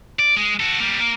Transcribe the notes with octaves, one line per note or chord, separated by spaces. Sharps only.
D5
G#3
F#4 A4
G3 A#3
A#3